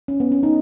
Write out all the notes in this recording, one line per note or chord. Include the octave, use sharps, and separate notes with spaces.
C#4
B3
C#4
D#4